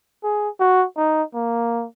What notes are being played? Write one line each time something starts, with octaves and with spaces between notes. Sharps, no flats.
G#4
F#4
D#4
A#3